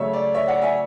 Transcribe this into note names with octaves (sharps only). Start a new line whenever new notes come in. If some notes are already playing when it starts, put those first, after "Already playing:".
Already playing: C#3 F#3 A3 C#5 E5
D5
C#5 E5
D5 F#5
E5 G#5